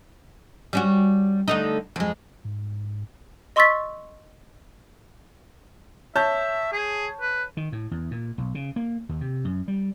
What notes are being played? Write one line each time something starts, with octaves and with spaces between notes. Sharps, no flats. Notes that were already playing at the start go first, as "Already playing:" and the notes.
G3 C#4 F#4
D3 A3 D#4
F2 G#3
G#2
D#5 C6 C#6 E6 A6 B6
C#5 E5 A5 G6
G#4
B4
D#3
A2
E2
A#2
B1
C#3
A#3
D#2
C3
F#2
G3